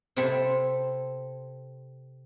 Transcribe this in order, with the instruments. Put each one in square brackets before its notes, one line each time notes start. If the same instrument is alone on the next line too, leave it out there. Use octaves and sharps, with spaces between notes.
[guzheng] C3 C4 E4 A4 E5 C6